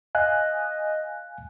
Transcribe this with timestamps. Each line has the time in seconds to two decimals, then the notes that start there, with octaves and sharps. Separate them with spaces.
0.15 D#5 F5 G#5 F#6